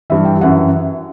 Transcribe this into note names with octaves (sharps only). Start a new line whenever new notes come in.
G2 E3 E5
G5
F#2 E3 F#5